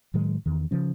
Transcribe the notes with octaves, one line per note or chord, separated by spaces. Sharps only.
A2 D#3 F#3 G#3
E2 D#3
C#3 F3 C#4